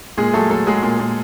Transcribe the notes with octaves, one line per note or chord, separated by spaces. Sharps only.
A#2 G#3 G#4
F#3 A3 A4
F#3 A3 A4
F#3 G#3 G#4
A#2
A#2